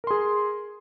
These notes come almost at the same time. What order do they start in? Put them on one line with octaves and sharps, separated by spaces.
A#4 C6 G#4